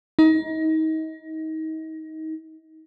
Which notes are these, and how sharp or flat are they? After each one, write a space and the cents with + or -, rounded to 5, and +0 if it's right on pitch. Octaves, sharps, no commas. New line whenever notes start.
D#4 +30